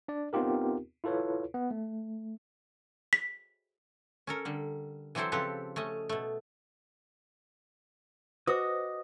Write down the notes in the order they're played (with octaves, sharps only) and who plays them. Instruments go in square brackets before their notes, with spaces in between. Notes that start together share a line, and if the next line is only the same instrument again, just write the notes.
[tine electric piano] D4 D5
B3 C4 D#4 F4 G4 A#4
E4 F4 A4 B4 C#5
B3
A3
[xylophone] B6
[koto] C#4 A4 A#4
D3 G3
E3 F#3 C4 E4 A4 C5
C#3 F3 C4 G4 A4 B4
A3 C#4 D#5
B2 A3
[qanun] F#4 [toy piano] B4 C5 D6 [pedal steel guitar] D#5 D#6